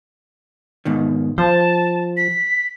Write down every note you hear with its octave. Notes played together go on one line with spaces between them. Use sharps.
G#2 B2 D#3
F3 C5 A5
B6